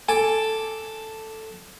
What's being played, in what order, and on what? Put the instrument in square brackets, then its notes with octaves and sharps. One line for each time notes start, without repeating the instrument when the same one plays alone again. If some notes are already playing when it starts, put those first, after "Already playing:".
[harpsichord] A4 A5 D6 [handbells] G#5